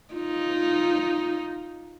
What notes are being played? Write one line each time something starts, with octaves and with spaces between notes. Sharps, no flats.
D#4 F4